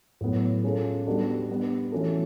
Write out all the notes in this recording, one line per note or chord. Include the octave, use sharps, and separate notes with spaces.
A2 F#3 B3
G#3 C#4 F4 A4
G3 B3 D4 F#4 A4
G3 B3 D4
E3 A3 C#4 F#4 A4